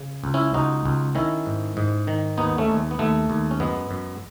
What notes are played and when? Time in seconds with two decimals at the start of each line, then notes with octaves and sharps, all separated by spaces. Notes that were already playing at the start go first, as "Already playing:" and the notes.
Already playing: C#3
0.24 C#2
0.34 C#4 E4
0.54 C#2 D#4 F#4
0.85 C#2
1.15 D#3 C#4 E4
1.46 G#2
1.77 G#2
2.07 D#3
2.38 D#2 B3 D#4
2.58 A3 C#4
2.68 D#2
2.91 B3
2.99 D#2 A3
3.30 D#2
3.51 C#4
3.60 F#2 G#3 B3
3.91 F#2